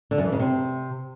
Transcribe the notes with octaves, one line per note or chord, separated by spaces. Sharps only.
D3
F#2
E3
C#3
C3